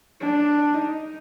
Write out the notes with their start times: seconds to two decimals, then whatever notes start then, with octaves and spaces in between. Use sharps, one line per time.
0.21 D4
0.74 D#4